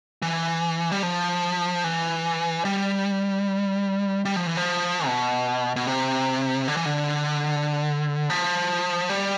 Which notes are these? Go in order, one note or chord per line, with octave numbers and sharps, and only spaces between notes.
E3
G3
F3
E3
G3
G3
F3
E3
F3
B2
B2
C3
D3
E3
D3
F3
G3